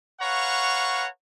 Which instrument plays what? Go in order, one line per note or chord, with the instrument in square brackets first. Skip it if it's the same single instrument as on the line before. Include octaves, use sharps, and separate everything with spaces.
[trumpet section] B4 C#5 F5 F#5 A#5 C#6